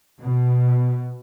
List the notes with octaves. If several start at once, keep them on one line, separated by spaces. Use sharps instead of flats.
B2